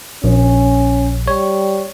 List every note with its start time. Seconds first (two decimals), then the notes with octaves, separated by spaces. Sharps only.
0.24 A#1 C#4
1.28 G3 C#5